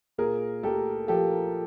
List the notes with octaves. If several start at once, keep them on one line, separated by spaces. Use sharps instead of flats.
A#2 G#4 A#4
A3 G4 A4
F3 G4 A4